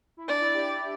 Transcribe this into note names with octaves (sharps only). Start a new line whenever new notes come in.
E4
D4 D5
E4
G4
G4